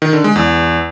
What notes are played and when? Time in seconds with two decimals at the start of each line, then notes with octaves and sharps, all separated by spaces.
0.02 D#3
0.13 D3
0.24 G#3
0.36 E2